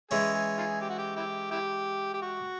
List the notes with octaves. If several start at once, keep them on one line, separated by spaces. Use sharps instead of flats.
E3 G#3 C#4 G#4
G#4
D#4 F4 G#4
G4
F#4
G4
E4 G4
E4 G4
G4
F#4